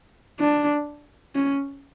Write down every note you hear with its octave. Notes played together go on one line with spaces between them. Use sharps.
D4
C#4